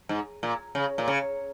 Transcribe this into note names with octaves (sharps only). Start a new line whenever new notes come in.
G#2
A#2
C#3
A#2
C#3